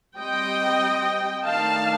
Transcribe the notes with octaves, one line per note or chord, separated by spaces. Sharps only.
G3 C4 D#5 G5
D#3 A3 D4 F5 A5